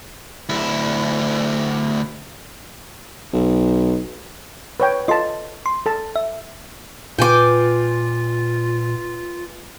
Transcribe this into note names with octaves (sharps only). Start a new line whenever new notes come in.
D2 E4
B1
B4 C#5 G5
F4 A4 D#5 A5 C6
C6
A4 A5
E5
A#2 F4 B4 G5 G#5 D6